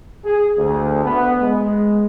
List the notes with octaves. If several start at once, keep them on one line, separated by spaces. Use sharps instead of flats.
G#4
D2
B3
G#3